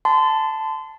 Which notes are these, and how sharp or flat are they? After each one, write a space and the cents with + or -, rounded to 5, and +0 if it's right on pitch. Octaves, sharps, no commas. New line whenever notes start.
A5 +0 C6 -35